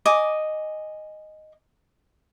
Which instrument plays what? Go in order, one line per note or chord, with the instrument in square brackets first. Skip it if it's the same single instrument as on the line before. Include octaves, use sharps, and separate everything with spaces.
[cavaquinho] D#5 G#5 D6